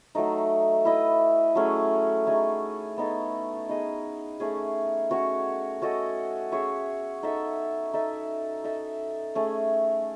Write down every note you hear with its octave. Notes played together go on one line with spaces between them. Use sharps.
F#3 A3 D#4
E4 B4 D#5
F#3 A3 C#4 G#4
A3 D#4 G#4 C#5
B3 D#4 A4
B3 D#4 G#4 D#5
A3 C#4 G#4
C#4 F#4 C#5
C#4 F#4 A4 D#5
C#4 G#4 C#5 E5
D#4 A4 E5
D#4 A4 E5
D#4 A4 E5
A3 C#4 G#4